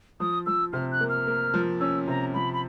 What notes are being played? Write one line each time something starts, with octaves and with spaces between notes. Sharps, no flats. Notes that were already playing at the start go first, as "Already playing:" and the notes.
F3 D#6
F3 E6
C3 F6
F#6
A#3
F6
A#3
F3
C#4 E6
C3 A#5
F3 B5
B5